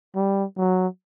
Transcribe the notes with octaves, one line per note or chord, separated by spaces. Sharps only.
G3
F#3